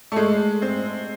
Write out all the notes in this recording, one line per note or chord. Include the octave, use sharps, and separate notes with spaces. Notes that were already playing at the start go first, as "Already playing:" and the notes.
A3
G#3
C4